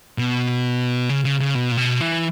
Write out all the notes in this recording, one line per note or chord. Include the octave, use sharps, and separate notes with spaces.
B2
C#3
C#3
C#3
B2
A#2
B2
E3